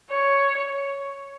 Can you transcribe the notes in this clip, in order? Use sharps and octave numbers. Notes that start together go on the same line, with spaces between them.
C#5